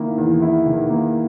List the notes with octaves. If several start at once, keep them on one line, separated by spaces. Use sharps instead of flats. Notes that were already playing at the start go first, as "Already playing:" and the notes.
Already playing: D#3 A#3 E4
E2
E4
D#3
A#3